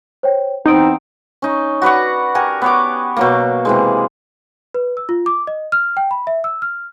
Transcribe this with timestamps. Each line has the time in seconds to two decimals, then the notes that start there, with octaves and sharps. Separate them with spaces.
0.23 C5 C#5 G5
0.66 E2 B3 C4 D#4 D#5 D#6 D7
1.42 C#4 D#4
1.82 F#4 B4 D5 F#5
2.35 G4 A#4 F#5 G#5
2.62 B3 C#5 D6
3.16 B2 F#3 A#3
3.65 C3 E3 G#3
4.74 B4
4.97 E6
5.09 F4
5.26 D6
5.47 D#5
5.72 F6
5.97 G5
6.11 B5
6.27 E5
6.44 E6
6.62 F6